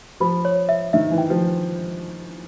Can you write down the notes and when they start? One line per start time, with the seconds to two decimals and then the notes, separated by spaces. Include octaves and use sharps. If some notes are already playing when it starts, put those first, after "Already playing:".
0.20 F3 B5
0.45 C#5
0.69 E5
0.93 D#3 E5
1.11 E3
1.18 G5
1.30 F3